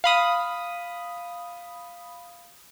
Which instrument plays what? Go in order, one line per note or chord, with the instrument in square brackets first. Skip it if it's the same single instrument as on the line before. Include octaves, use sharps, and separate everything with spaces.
[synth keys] F5 B5 D#6